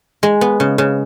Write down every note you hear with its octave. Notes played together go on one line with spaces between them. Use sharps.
G#3
B3
C#3
C#3